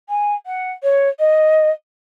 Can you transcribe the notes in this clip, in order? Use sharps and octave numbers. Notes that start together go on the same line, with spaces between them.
G#5
F#5
C#5
D#5